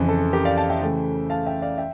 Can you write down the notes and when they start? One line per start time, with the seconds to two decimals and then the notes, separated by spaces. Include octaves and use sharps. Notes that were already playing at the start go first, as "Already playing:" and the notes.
Already playing: F2 C#3 E3
0.09 A4
0.33 G4 A#4
0.45 D5 F5
0.57 F5 A5
0.69 E5 G5
0.82 C#3 E3 A3
1.30 F5 A5
1.46 E5 G5
1.62 D5 F5
1.78 E5 G5